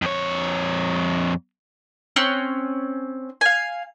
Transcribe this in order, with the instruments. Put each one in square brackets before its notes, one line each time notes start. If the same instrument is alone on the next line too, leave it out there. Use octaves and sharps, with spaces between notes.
[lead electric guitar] F2 C#5
[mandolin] C4 C#4 F#6
F5 G#5